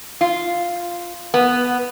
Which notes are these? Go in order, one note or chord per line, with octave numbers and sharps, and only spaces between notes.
F4
B3